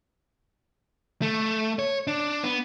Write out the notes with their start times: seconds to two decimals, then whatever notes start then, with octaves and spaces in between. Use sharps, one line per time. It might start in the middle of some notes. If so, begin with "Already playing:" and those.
1.22 A3
1.79 C#5
2.07 D4
2.44 B3